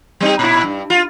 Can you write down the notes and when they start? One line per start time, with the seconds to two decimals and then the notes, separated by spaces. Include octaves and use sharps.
0.20 G3 C4 D#4
0.39 A#2 E4
0.64 G2
0.90 F4